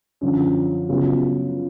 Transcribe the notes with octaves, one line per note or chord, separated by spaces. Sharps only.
F#2 D3 F3
C#2 C#3 F#3 B3 F4